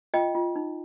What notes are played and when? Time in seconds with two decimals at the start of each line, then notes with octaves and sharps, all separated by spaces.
0.14 F4 D#5 G5
0.35 F4
0.56 D#4